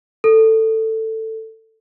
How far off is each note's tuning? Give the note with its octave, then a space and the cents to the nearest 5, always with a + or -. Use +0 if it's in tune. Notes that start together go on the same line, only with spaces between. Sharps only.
A4 +15